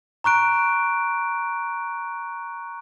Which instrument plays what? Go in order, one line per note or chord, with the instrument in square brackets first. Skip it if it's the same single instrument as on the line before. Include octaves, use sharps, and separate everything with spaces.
[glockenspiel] A#5 C#6 F#6 D7